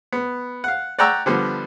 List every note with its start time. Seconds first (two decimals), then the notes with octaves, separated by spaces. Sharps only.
0.12 B3
0.64 F5 F#5
0.99 D5 F#5 G5 A#5 C#6 E6
1.26 D3 F3 G3 B3